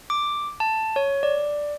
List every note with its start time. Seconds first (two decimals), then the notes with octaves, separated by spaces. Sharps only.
0.10 D6
0.60 A5
0.96 C#5
1.23 D5